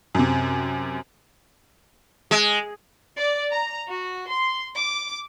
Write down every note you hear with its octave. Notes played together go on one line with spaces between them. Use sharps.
F#2 C3
G#3
D5
A#5
F#4
C6
D6